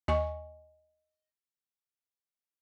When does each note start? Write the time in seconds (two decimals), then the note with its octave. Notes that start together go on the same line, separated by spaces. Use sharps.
0.08 D#2 D#5 G#5 C#6